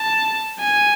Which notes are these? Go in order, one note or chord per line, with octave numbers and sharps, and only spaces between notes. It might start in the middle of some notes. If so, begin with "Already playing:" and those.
Already playing: A5
G#5